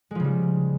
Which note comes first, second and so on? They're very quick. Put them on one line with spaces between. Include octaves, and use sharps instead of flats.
G#3 F3 C#3 G3